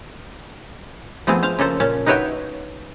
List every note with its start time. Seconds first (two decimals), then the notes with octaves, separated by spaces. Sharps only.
1.27 F3 A3 B3 C4 G#4
1.43 C5 F5
1.58 C#3 A#3 A4 C5
1.80 A#2 C#4 A5
2.06 D#4 F#4 B4 C#5 E5 G5